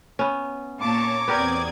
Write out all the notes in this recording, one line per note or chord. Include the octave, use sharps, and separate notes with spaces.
B3 C#4
A#2 C#5 A5 A#5 C#6 D6
E2 B3 C4 G4 A#4 D5 D#6 G#6